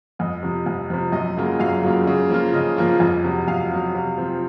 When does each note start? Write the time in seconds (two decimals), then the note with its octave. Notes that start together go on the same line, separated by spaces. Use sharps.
0.19 F2 D#5
0.43 C3 F3
0.66 F2
0.90 C3 F3
1.12 F#2 D#5
1.37 C#3 F#3 A#3 F4
1.60 F#2 F5
1.83 C#3 F#3 A#3 F4
2.07 C#3
2.30 F3 A#3 F4
2.54 C#3 D#5
2.76 F3 A#3 F4
3.00 F2
3.24 C3 F#3
3.48 F2 F5
3.71 C3 F#3
3.94 C3
4.18 F3 C4